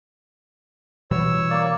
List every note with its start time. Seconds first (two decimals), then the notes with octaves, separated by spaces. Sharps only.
1.11 B2 E3 G3 C#5 E6
1.50 A#3 D5